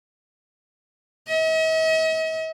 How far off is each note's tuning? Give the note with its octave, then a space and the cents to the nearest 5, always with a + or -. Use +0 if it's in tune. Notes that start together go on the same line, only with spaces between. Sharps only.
D#5 +45